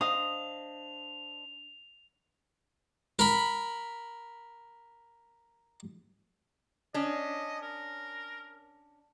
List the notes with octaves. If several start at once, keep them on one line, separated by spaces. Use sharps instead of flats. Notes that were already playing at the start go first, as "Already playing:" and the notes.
D4 C5 D#5 F5 D#6 F7
A#4 B5
C#4 D4 D#5
A#4